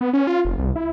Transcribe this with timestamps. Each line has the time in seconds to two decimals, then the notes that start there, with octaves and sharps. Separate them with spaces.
0.01 B3
0.13 C#4
0.27 F4
0.45 F1
0.58 C2
0.76 E4